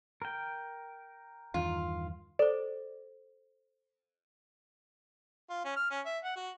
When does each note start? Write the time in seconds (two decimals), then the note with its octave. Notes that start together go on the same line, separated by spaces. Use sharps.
0.22 A#4 G5
1.54 E2 G2 D#3 F4
2.39 A4 C5 D5
5.50 F4
5.65 C#4
5.76 F6
5.91 C#4
6.06 E5
6.23 F#5
6.36 F#4